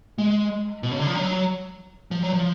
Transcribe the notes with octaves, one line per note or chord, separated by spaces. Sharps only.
G#3
B2
C#3
D3
F3
F#3
F3
F#3
F3